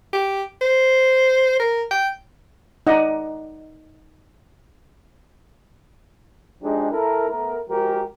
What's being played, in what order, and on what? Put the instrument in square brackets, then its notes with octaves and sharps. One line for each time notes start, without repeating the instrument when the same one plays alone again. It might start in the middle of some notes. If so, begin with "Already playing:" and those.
[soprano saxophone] G4
C5
A#4
G5
[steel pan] D#4 D5 D#5 F#5
[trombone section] F3 G#3 D4 D#4 G4 G#4
E4 A4 A#4
A3 B3 A#4
F3 G#3 F#4 G4 A#4